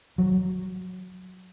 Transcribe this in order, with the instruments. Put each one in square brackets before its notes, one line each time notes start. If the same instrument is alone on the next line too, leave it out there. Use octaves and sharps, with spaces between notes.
[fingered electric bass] F#3